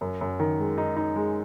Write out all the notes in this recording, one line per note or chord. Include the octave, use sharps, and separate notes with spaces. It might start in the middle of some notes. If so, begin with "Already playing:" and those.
F#2
F#2
D#3
G#3
D#4
D#4
G#3